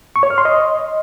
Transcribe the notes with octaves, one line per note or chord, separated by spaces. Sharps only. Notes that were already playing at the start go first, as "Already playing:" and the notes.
C#6
C#5
F6
C6
D#5